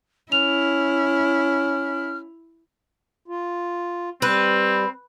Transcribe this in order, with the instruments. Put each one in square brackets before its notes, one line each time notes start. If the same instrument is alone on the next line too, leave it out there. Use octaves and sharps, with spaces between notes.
[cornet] C#4 [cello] E4 [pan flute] F6 [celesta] F7
[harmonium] F4
[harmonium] G3 [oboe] C4 [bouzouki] B4